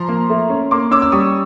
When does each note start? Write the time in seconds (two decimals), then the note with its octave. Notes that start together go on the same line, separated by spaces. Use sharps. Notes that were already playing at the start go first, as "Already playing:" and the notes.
Already playing: F3 A#5 C6
0.08 A#3
0.30 A3
0.50 C#4
0.71 A#3 C6 D6
0.91 C#4 D6 E6
1.02 E6
1.12 G3 C#6 D#6